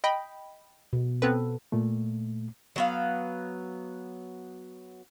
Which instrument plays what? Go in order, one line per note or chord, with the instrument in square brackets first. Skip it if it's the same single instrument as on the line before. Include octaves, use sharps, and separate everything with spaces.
[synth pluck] D#5 G5 B5
[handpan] B2
[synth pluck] B3 C4 B4 [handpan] A4
[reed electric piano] A#2 A3
[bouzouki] F#3 B3 F5